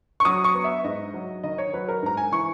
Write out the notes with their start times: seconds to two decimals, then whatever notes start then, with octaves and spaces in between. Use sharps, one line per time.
0.20 C#6
0.25 F#3 D#6
0.44 C#6
0.55 B3
0.64 E5
0.84 G#2 D#5
1.14 F#3
1.44 D#3 D#5
1.58 C#5
1.73 F#3 B4
1.88 A#4
2.03 G#2 A#5
2.17 G#5
2.32 E3 C#6